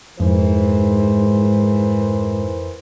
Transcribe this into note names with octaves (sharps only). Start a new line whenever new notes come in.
F2 G#2 E3 A#4 C5